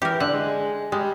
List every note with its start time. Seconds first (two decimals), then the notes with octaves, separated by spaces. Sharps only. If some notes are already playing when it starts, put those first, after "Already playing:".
0.02 E3 G4 A#4
0.20 D3 F#6
0.34 G#3
0.92 G3 G#3